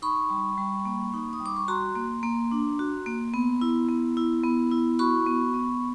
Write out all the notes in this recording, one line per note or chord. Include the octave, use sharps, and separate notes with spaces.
D#4 B5 C#6
G3
G3
A#3
D#4
D#6
G3
D6
C#6
F#4 A#5 C6
A#3
A#3
D4
F#4
A#3
B3
E4
B3
E4
B3
E4
F#4 B5 C#6
B3
B3